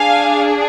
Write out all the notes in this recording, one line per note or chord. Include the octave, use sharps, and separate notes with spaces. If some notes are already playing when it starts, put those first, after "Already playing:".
Already playing: D4 G#4 F5 G#5